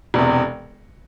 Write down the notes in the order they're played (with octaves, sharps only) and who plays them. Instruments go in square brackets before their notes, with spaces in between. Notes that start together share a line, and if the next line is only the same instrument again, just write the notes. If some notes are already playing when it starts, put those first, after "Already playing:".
[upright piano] E1 E2 C3